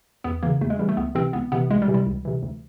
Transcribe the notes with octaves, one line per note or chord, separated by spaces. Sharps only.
E2 B3
C#3 E3 A#3
E2 A3
G#3
C#3 E3 G3
A3
C#2 B3
C3 E3 C4
C#2 B3
C3 E3 B3
C#2 G#3
G3
C3 E3
G3
C#2
C3 E3
D2